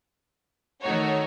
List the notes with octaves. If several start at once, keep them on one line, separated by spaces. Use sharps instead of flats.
D#3 A3 D#4 F#4 C#5